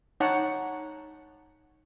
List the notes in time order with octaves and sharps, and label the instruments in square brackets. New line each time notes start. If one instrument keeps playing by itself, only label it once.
[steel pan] D#4 C#5 F#5 A5